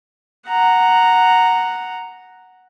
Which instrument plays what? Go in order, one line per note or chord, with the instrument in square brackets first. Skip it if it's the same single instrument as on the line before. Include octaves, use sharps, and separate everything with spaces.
[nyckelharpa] F#5 A#5